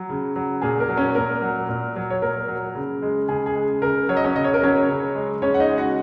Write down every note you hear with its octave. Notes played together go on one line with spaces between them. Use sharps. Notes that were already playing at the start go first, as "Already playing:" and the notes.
Already playing: F#3
C#3
F#3
A#2 G#4
A#4
F#3
C#4 C#5
A#2 A#4
F#3
A#2
F#3
C#5
A#2 A#4
F#3
C#3
G#3
C#3 G#4
G#4
G#3
C#3 A#4
F#3 C#5
D#5
C#4 C#5
C#3 D#5
C#5
A#4
F#3 C#4 C#5
C#3
G#3
C#3 C#4 C#5
F#5
D#4 D#5
G#3
F#4 F#5